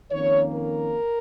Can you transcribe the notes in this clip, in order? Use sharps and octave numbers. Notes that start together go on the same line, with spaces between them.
F2 D#3 A#3 C#4 C#5
A#4